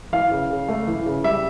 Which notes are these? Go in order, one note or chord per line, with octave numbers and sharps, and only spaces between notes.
E3 F5
C#3
C#3
A3
E3
C#3
G3 E5